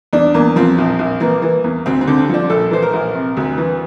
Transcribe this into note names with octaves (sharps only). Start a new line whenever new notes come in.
E2 D4
E2 A#3
F3 C4
A#1
A#1
E3 A#3
E3
E2
D2 C4
C4
D3
C4
F3 D4
A#1 A4
E3 C5
A#4
A#1
C3
D2
E3